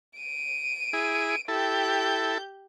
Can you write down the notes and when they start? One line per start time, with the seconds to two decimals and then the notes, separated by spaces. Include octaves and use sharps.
0.18 D7 D#7
0.93 E4 G#4
1.48 E4 G4 A4 G6